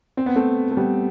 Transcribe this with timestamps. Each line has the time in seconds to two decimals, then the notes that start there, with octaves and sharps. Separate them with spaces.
0.17 C4
0.26 B3
0.36 A3 C4
0.71 A3
0.77 G3 B3